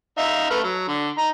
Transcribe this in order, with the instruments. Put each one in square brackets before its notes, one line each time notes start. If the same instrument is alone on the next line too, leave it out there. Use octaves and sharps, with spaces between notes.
[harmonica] D#4 E5 F5
A3 B4 F6
F#3
D3
D#4 A#5